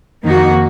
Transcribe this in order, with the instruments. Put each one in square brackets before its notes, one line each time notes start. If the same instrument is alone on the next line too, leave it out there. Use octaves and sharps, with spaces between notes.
[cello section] F2 D#3 A#3 D#4 F#4